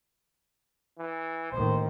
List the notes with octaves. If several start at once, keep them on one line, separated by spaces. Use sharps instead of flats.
E3
A1 D#2 D#3 C5